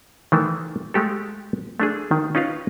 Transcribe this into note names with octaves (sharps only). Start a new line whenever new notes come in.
D#3 E3 A3
G#3 A3 G4 A4
A3 D4 G#4
D#3
C#4 D#4 F4 B4 F5